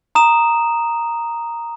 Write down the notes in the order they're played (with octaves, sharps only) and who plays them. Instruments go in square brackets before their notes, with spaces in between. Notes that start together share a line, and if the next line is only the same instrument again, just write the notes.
[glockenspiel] A#5 D#6 E7